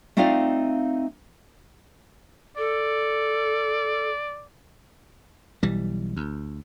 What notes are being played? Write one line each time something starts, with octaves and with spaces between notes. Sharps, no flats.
A3 C4 D#4 F4 D5 F5
A4 D5
B1 E3 G3
D2